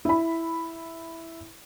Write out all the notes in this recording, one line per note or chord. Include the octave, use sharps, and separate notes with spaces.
E4 B5